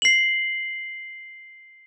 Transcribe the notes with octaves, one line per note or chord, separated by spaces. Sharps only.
C7 F#7